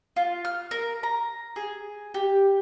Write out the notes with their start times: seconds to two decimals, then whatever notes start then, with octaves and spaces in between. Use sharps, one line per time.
0.16 F4
0.45 F6
0.71 A#4
1.03 A#5
1.56 G#4
2.14 G4